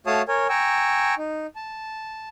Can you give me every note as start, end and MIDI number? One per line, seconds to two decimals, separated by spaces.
0.07 0.22 57
0.07 0.22 66
0.07 0.22 73
0.07 0.22 77
0.07 0.22 81
0.07 0.22 87
0.28 0.47 70
0.28 0.47 73
0.28 0.47 80
0.49 1.15 79
0.49 1.15 80
0.49 1.15 82
0.49 1.15 85
0.49 1.15 88
1.18 1.47 63
1.56 2.29 81